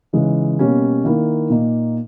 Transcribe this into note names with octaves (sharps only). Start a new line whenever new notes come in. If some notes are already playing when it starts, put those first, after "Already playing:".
C#3 E3 G#3 D#4
B2 G3 A#3 C#4
D#3 A#3 E4 A#4
A#2 A#3 D#4